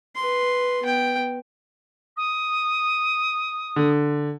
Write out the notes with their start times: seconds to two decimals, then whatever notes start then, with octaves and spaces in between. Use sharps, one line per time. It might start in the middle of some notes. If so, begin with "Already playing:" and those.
0.15 B4 C6
0.83 B3 G5
2.16 D#6
3.76 D3